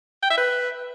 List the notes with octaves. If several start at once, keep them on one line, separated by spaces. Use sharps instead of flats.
G5
E5
B4